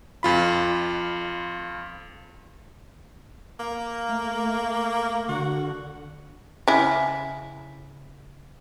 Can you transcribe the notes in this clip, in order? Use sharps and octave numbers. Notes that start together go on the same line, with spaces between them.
F2 F4 B5
A#3
A3
D3 F#4
C#3 E4